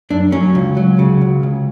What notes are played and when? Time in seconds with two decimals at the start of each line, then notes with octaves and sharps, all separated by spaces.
0.10 F#2 D4
0.32 F#3 C#4
0.55 C#2
0.77 F#3
0.99 C#3
1.21 C#2
1.43 C#2